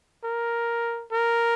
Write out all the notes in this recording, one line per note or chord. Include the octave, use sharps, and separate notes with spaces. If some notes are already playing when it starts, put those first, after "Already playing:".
A#4
A#4